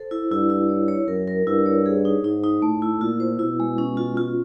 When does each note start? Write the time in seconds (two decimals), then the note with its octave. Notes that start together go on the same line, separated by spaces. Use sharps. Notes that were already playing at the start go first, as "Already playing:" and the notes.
Already playing: A4 C5
0.11 E4
0.31 G2 E4
0.50 E4
0.69 C#5
0.88 C#5
1.08 F#2 A#4
1.28 A#4
1.47 G2 E4
1.66 C#5
1.86 G#4
2.05 D#4
2.24 G#2 D#4
2.44 D#4
2.62 A2 A3
2.82 E4
3.01 A#2 F4
3.20 C5
3.39 B2 E4
3.60 G#3
3.78 C#4
3.97 F4
4.17 F4